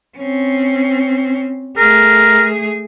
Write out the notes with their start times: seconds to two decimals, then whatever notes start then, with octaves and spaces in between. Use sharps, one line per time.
0.18 C4 C#4
1.77 A3 G#4 A#4